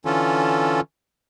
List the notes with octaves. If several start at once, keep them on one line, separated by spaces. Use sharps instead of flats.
D3 E3 C#4 F4 A4